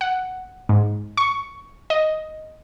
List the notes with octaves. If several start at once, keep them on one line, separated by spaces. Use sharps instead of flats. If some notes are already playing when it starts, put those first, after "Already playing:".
F#5
G#2
C#6
D#5